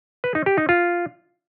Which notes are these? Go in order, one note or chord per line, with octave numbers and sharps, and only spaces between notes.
B4
D#4
G4
D#4
F4